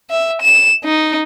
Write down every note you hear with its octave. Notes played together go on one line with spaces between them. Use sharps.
E5
E7
D#4